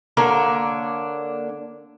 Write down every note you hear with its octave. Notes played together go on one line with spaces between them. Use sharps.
D3 A#3 D4 C#5